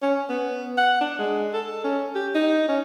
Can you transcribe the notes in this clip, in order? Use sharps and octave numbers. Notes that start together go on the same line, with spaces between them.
C#4
B3
F#5
D4
G#3
A4
C#4
G4
D#4
C#4